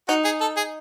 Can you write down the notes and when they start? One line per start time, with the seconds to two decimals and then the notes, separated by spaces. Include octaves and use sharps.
0.08 D#4 F#4
0.25 G#4
0.41 A4
0.57 G#4